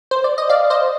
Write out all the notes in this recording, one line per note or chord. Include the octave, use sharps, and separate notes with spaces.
C5
D5
D#5
D5 F5
C5 D#5